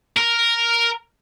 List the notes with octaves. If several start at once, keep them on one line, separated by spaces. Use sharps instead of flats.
A#4